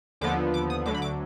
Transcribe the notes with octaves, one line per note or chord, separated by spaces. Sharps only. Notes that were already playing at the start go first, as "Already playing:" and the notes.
D#2 D3 F3 B3 D6
D6
D#6
D2 D3 F#3 D6
B5
D6